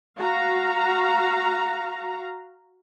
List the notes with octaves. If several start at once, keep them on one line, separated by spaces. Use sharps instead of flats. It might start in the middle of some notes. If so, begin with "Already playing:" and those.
F#4 F5 A#5